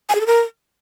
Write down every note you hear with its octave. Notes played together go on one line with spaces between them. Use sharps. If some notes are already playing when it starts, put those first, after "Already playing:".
G#5
G#4
A4
A#4